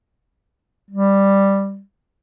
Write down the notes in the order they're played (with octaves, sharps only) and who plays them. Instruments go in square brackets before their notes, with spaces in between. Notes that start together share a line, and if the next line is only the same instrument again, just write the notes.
[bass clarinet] G3